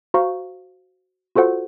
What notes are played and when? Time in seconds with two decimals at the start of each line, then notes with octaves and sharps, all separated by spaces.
0.14 F#4 C5 F5 A#5 C#6
1.36 F4 F#4 A4 C5 F#5